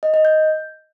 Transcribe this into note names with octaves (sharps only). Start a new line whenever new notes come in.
D#5
D#5
G6